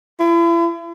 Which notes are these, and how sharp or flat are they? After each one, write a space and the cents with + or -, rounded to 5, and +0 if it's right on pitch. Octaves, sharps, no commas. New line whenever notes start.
E4 +40